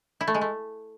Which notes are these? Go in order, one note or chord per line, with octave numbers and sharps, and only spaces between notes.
E4
A3
G#3
A3